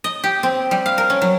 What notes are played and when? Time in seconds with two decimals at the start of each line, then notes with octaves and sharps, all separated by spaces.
0.04 D#5
0.24 G4
0.43 C4
0.71 G3
0.86 F5
0.98 A#4
1.10 C#4
1.22 F#3